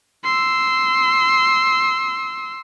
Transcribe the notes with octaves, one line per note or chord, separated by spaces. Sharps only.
C6 E6